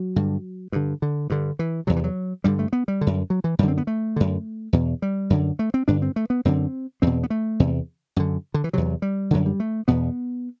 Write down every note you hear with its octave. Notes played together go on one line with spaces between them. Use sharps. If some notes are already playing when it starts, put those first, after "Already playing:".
Already playing: F#3
G2 D3
G2 D3
D3
G2 D3
E3
E2 C3 F#3
E3
F#3
G2 D3 G3
A3
B3
G3
D3
F#2
F#3
E3
F#2 D3 G3
C4
B3
A3
F#2 D3
E2 B2
G3
F#2 D3
A3
C4
G2 D3 D4
C4
A3
B3
F#2 D3 C4
E2 B2 C4
B3
A3
E2 C3
F#2 D3
D3
E3
E2 C3 F#3
G3
F#2 D3 F#3
G3
A3
E2 B2 B3